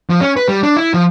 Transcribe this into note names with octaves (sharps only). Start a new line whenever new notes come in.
F3
C#4
B4
G3
D4
E4
F3